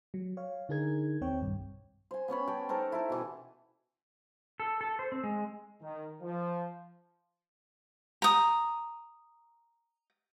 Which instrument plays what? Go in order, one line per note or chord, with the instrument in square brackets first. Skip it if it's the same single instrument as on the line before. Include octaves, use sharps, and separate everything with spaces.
[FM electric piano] F#3
C#5 F5
D3 D#4 G#4 A#4 G#6
D#2 C4 C#5 G5
B1 G2
[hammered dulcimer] C5 G#5
B3 C#4 C#5 B5
G4 G5 A5
D#4 A4 A#4 C5
E4 A4
B2 E3
[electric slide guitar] A4
A4
C5
C4
G#3
[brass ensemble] D#3
F3
[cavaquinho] A#5 D#6